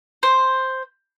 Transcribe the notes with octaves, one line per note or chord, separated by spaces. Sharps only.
C5